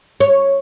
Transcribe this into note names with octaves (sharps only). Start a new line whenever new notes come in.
C#5